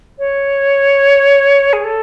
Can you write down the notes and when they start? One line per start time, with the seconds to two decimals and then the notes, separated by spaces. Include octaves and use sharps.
0.18 C#5
1.73 G#4
1.84 A4